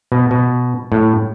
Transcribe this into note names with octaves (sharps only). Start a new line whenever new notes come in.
B2
B2
A2